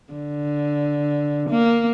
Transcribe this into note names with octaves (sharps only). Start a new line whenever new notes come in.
D3
A#3